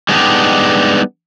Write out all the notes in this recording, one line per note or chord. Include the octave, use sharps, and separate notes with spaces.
G3 G#3 B3 D4 D#4 G4